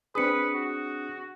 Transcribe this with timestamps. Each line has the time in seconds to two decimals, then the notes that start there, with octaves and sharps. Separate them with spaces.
0.15 C4 D4 G#4 B4 D#6 C#7
0.55 F#4